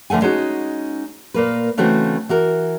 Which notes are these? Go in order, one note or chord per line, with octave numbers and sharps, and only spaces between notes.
D3 F3 A3 F#5 G#5
G#3 C#4 D#4 F#4
A#2 A#3 B4
C#3 E3 A3 C4 F#4
E3 F#4 A#4